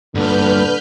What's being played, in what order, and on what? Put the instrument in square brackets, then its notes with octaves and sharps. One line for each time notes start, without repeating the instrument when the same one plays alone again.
[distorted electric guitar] G2 A#2 [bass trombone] D3 [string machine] B4 F6 G6